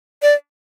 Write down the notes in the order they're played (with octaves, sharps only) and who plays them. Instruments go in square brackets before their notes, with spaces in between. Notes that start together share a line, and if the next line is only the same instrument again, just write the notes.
[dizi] D5